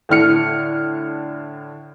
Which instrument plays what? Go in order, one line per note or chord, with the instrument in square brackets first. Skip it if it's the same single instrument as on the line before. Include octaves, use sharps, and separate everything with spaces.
[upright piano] A2 D3 F6 C#7